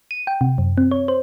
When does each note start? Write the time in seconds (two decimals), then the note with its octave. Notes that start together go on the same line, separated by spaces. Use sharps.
0.11 D#7
0.27 G5
0.41 C3
0.58 F#2
0.78 C4
0.91 C#5
1.08 C5